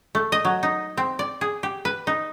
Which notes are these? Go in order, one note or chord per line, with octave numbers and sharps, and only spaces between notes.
A3
D#5
F#3
D#4
C4
D5
G#4
G4
B4
D#4